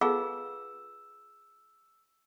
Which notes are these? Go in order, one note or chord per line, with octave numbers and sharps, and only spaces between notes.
B3 F4 G#4 A4 F5 E6